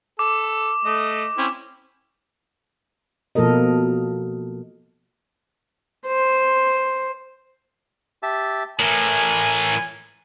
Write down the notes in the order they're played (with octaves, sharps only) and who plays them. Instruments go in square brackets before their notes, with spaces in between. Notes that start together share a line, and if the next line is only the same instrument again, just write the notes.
[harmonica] A4 [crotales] D6
[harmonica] A3 D#5
C4 C#4 E4
[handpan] B2 F3 A#3 A4 A#4 D#5
[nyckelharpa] C5
[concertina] G4 E5 A5
[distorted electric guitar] A2 E3 [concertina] A#4 [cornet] G#5